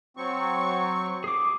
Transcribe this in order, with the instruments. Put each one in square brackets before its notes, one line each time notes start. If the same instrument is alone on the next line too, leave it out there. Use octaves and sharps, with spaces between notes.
[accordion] F#3 C4 C#6
[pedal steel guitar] G#4 D6